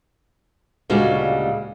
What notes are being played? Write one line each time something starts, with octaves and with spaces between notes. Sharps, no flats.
D2 A#2 C#3 G3 G#3 F#4